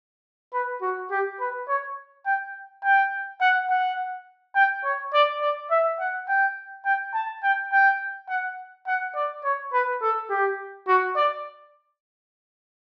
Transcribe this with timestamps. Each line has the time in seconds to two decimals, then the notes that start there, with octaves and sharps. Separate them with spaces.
0.54 B4
0.82 F#4
1.11 G4
1.40 B4
1.68 C#5
2.26 G5
2.84 G5
3.41 F#5
3.70 F#5
4.55 G5
4.84 C#5
5.14 D5
5.41 D5
5.71 E5
5.99 F#5
6.28 G5
6.85 G5
7.14 A5
7.43 G5
7.72 G5
8.29 F#5
8.87 F#5
9.15 D5
9.44 C#5
9.73 B4
10.02 A4
10.30 G4
10.87 F#4
11.16 D5